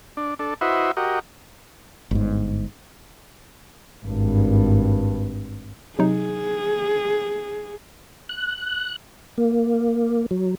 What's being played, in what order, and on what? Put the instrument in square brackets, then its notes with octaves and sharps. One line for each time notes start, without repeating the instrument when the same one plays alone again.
[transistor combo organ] D4
D4 A4
E4 F#4 B4 C5 D#5 E5
F#4 G4 A#4 D#5
[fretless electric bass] G1 G#2
[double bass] G#1 G2
[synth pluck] C3 F#3 D#4 [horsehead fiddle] G#4
[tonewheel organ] F#6
A#3
F#3